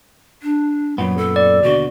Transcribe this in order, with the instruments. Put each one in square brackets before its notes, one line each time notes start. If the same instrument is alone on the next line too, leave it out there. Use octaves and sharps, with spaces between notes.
[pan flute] D4
[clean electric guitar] F#2 A#2 B3 [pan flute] F#3
[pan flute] A4
[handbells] D5
[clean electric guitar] D#2 B2 D3 [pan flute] F#4